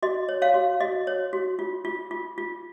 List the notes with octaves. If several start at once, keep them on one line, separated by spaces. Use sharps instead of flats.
F#4 D#5
C#5
C#5 F5
F#4
F#4 D#5
C#5
F#4
F4
F4
F4
F4